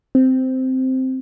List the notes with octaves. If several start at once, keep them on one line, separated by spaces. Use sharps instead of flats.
C4